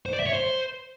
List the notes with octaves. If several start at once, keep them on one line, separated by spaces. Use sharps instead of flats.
C5
D5
E5
C#5
C5